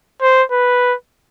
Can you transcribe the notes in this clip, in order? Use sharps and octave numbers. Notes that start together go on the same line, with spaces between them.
C5
B4